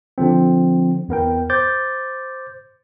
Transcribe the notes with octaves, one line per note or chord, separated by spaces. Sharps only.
D3 F3 C4
E2 B3 A#4 G5
C5 D6 G6 A6